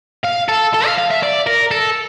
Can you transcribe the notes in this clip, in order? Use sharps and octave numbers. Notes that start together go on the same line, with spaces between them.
F5
A4
A4
F5
F5
E5
D5
A#4
A4